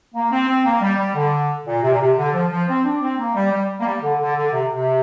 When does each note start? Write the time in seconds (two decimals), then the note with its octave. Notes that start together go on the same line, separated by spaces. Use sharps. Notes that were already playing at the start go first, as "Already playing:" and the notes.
0.14 A#3
0.31 C4
0.48 C4
0.65 A#3
0.81 G3
0.98 G3
1.15 D3
1.66 A#2
1.82 C3
1.91 A#2
2.00 C3
2.17 D3
2.33 F3
2.51 F3
2.68 C4
2.84 D4
3.01 C4
3.18 A#3
3.35 G3
3.51 G3
3.80 A#3
3.85 G3
4.02 D3
4.20 D3
4.36 D3
4.52 C3
4.71 C3